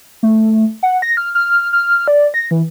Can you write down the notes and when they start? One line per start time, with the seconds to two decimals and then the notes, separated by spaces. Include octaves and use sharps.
0.23 A3
0.83 F#5
1.02 A#6
1.17 F6
1.35 F6
1.73 F6
2.08 D5
2.34 A#6
2.51 E3